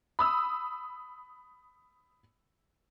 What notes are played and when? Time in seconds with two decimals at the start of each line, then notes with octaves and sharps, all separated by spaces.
0.19 B5 D#6 E6